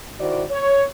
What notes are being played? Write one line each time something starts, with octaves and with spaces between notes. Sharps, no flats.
D#3 E4 F#4 C5 D5
C#5